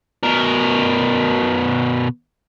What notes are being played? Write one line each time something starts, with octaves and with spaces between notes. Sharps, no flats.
B2 A#4